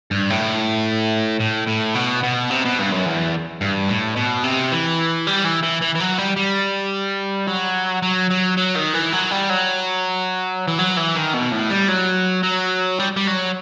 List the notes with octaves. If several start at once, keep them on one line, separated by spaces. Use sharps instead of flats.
G2
A2
A2
A2
B2
B2
C3
B2
G2
F#2
E2
G2
A2
B2
C3
E3
G3
E3
E3
E3
E3
F#3
G3
G3
F#3
F#3
F#3
F#3
D#3
E3
F#3
G3
F#3
E3
F#3
E3
D#3
B2
A2
G3
F#3
F#3
G3
G3
F#3